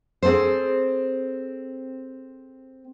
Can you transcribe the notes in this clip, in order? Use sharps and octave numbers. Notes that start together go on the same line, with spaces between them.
C4 G#4 A4 C5